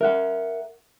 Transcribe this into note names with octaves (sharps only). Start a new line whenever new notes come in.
A#4 E5 F#5 F#6